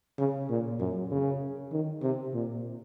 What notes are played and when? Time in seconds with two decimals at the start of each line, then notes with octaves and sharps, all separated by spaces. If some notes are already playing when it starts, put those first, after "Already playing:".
0.19 C#3
0.50 A#2
0.79 F#2
1.11 C#3
1.72 D#3
2.03 C3
2.34 A#2